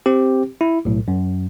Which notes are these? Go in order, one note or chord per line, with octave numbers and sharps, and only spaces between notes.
C4 G4
E4
B1 A2
F#2